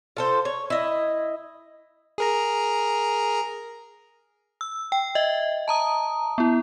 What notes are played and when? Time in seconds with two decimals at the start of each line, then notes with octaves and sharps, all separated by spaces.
0.17 F4 A4 C5
0.45 C#5
0.70 E4 D#5
2.18 G#4 A#4 A#5
4.61 E6
4.92 G5
5.15 D#5 E5
5.68 A5 A#5 D#6
6.38 B3 E4